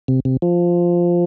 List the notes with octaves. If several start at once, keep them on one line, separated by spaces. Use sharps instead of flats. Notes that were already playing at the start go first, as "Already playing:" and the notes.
C3
C3
F3